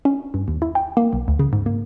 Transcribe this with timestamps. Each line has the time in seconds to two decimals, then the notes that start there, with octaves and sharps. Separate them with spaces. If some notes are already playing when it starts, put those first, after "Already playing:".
0.05 C#4
0.34 G2
0.48 D#2
0.62 E4
0.75 G5
0.97 A#3
1.13 B1
1.28 D2
1.39 C#3
1.53 G#2
1.66 A#3